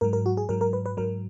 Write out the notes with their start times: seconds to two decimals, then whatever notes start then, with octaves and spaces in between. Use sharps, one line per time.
0.01 G#2 F#3 A#4
0.13 A#4
0.26 F#4
0.37 G#4
0.49 G#2 F#3 A#4
0.61 A#4
0.73 B4
0.86 B4
0.97 G#2 F#3 A#4